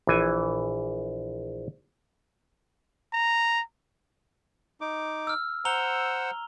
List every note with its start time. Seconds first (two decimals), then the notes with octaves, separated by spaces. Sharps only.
0.07 A#1 E3 G#5
3.13 A#5
4.81 D#4 D6
5.27 E6 F6
5.65 C5 F#5 A#5 E6 F7 G7